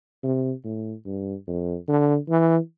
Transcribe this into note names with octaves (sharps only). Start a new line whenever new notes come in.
C3
A2
G2
F2
D3
E3